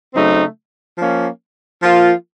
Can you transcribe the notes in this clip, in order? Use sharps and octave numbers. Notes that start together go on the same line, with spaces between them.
C#3 F#3 A3 C4 D#4
F3 A#3 C#4
F3 A#3 F4